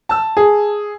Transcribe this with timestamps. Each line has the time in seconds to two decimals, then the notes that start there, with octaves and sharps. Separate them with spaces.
0.09 A5 E6
0.37 G#4